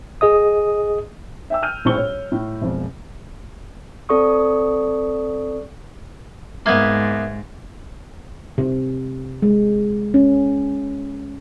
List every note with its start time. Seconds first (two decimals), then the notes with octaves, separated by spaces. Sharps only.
0.21 G#4 D#5 D#6
1.50 E5 G5 E6
1.63 F6 G6 D#7
1.85 D#1 A#1 A2 C4 C#6 G7
1.98 C#5
2.32 A2
2.62 E1 F2
4.09 C4 A4 D5 C#6 D#6
6.66 G#2 A#3 B3 E5 G#6
8.58 C3
9.42 G#3
10.14 C#4